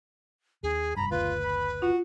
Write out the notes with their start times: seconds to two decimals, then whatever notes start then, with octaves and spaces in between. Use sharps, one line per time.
0.63 D#2 D4 G#4
0.97 F1 G2 A#5 B5
1.11 F#1 D2 F4 B4
1.43 B5
1.82 F4 F#4